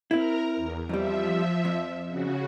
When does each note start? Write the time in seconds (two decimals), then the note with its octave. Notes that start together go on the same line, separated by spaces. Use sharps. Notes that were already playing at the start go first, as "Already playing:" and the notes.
0.11 C4 E4 A#4 A#5
0.56 E2
0.89 F2 F3 G3 E5
1.65 F2
2.08 C#3 F#4